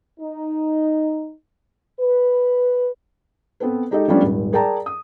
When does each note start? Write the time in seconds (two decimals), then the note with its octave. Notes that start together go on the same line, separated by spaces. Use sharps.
0.20 D#4
2.00 B4
3.60 B3 C4 A4 B4
3.91 G#3 D#4 G4 A4 D#5
4.08 F3 G3 A3 B3 C#4 D4
4.22 D#1 G#1
4.53 G#4 A#4 D5 G5 A5 A#5
4.86 D#6